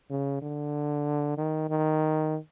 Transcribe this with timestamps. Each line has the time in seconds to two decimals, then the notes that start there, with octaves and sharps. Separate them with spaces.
0.10 C#3
0.42 D3
1.37 D#3
1.70 D#3